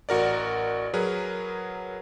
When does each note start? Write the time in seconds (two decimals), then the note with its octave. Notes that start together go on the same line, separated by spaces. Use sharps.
0.09 A1 F#4 A#4 D5
0.94 F#3 G#4 A#4 B4